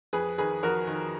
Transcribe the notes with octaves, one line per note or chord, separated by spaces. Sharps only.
F2 G#4 B4
D#3 G#4 B4
F2 F#4 A#4
D#3